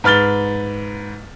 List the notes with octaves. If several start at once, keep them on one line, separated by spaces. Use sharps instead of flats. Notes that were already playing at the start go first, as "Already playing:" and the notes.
G#2 B4 F6 A6 G7